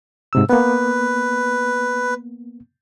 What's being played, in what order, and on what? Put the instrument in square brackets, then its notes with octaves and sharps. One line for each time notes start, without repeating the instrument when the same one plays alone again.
[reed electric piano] G#2 C3 E6
[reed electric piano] A#3 B3 [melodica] B4